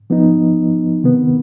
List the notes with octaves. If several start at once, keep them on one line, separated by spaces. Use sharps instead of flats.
F3 B3 D#4
C3 D#3 B3